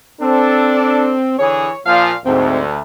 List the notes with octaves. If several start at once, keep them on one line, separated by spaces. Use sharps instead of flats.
C4 D4 A4
D3 E3 G#4 C#5
A#2 F3 F5
D2 G#2 C4